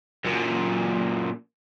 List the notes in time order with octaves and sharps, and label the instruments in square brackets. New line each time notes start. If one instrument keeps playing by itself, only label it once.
[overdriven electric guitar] F#2 A#2